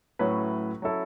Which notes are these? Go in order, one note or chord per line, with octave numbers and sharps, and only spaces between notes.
A2 F#3 C#4 E4 B4
F#3 C#4 E4 A4